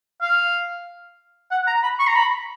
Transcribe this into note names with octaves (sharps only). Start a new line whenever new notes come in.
F5
F#5
A#5
B5
C#6
A#5
B5